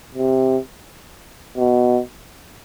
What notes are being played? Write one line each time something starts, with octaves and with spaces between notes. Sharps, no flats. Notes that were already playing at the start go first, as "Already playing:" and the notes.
C3
B2